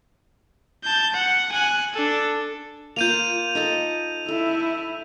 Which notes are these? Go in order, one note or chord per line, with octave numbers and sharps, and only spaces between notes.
A5 G6
F#5
G#5 F#6
D4 A4
A#3 F4 G6 D#7 F7
D#4 A4 D#5
E4 A4